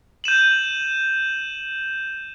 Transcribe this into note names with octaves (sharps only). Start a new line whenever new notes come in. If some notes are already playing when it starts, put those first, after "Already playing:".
G6 D#7 E7 F#7